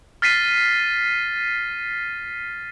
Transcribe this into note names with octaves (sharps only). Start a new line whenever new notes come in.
F6 A6 B6 C7 D#7